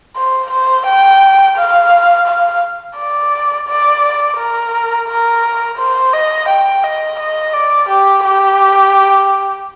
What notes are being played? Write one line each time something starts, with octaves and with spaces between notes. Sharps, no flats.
C5
C5
G5
F5
F5
D5
D5
A#4
A#4
C5
D#5
G5
D#5
D#5
D5
G4
G4